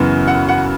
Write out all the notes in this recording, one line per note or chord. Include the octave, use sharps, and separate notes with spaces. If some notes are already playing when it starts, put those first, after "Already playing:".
Already playing: F#2 C#3 E3 B3
F#5
F#5